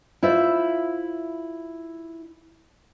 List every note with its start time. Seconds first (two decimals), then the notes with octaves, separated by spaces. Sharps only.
0.23 E4 F4 C5 E5